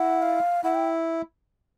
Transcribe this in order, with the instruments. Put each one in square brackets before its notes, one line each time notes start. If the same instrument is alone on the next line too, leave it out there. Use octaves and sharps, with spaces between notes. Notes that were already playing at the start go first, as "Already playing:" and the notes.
Already playing: [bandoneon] E4 [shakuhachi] F#5
[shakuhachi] F5
[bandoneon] E4 [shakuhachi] F#5
[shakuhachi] G5